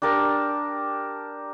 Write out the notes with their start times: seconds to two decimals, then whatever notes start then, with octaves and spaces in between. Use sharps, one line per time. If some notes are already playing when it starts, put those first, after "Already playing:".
0.02 D4 G4 A#4 A5